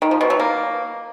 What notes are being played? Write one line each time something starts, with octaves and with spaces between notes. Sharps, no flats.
D#3
F3
B2
F#3
A#3